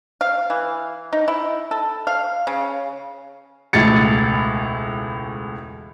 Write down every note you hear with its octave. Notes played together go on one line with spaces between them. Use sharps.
F5
E3
D#4
E4
A4
F5
C#3
E1 C#2 A2 A6 C#7